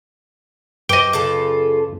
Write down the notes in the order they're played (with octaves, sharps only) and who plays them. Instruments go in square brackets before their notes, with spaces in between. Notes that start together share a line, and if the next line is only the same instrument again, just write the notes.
[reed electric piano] F#2 B4 D6 [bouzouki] G4 C5 [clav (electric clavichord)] D#5 G5
[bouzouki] C#3 F4 A4